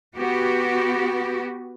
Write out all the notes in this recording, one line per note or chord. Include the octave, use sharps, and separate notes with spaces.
B3 F#4 G4